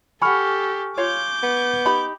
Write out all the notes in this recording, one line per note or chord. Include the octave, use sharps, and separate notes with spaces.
G4 A4 F#5 G#5 B5 C#6 F6
F4 C#5 F5 D6 G6
B3
D#4 G4 B5